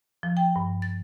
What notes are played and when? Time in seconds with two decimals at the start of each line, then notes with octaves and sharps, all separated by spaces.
0.23 F3
0.37 G5
0.56 G2
0.82 A6